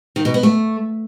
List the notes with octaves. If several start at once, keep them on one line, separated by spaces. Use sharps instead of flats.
D#3
B2
B3
A3